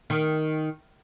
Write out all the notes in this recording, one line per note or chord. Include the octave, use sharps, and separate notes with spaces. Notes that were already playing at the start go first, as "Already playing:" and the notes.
D#3